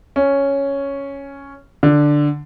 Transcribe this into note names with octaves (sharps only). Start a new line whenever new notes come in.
C#4
D3